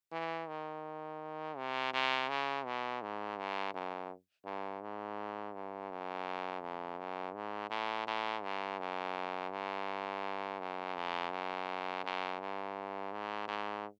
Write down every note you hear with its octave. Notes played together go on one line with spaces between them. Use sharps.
E3
D#3
C3
C3
C#3
B2
G#2
G2
F#2
G2
G#2
G2
F#2
F2
F#2
G#2
A2
A2
G2
F#2
G2
F#2
F2
F#2
F#2
G2
G#2
G#2